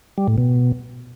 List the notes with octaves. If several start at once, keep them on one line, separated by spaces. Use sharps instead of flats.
G3
A2
B2